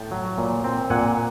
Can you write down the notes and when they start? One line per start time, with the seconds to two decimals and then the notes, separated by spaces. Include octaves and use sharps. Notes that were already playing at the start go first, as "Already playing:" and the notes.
Already playing: A2 G5 A5
0.11 F#3
0.38 A#2
0.64 C4
0.90 A#2 F#5 G#5